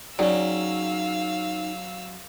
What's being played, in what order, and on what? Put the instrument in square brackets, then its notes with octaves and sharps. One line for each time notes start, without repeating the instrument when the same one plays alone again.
[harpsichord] F#3 C#4 [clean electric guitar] D#4 G#4 G5 [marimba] D5 [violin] F5 E6